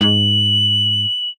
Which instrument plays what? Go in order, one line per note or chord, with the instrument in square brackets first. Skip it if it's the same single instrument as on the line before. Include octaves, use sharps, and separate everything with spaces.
[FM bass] G#2 [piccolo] F#7